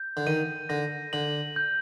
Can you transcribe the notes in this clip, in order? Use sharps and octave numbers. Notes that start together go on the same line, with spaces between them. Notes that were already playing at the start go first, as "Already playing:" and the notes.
Already playing: G6
D3
D#3 D#7
D3 A#6
D3 F#7
G6